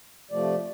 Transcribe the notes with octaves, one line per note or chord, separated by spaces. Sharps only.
C3 F3 A3 D5